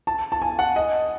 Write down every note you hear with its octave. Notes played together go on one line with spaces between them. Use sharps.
A5
A5
G#5
F#5
D#5